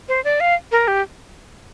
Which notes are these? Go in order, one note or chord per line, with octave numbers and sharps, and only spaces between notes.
C5
D5
F5
A#4
G4